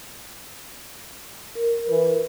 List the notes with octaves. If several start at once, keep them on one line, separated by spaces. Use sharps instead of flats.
A#4
E3 B4